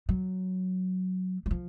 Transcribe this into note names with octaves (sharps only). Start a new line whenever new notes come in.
F#3
F#3
F3